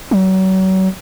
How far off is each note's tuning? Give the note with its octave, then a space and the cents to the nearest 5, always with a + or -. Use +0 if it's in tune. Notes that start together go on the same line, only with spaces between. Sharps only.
F#3 +35